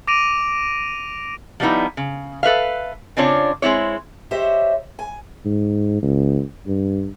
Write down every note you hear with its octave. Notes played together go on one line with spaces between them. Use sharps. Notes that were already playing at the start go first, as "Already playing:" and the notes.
D6 A#6 D7 D#7 F7
F3 G3 G#3 B3 D#4 E4
C#3
A4 B4 E5 F5
C#3 C4 D4 F4 C#5
G#3 C4 E4 C#5
G4 C5 C#5 D#5 E5
G#5
G#2
C#2
G2